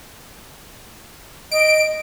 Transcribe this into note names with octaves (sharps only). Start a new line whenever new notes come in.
D#5 D7